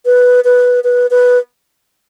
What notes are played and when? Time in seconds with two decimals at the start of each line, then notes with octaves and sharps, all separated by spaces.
0.06 B4
0.44 B4
0.84 B4
1.11 B4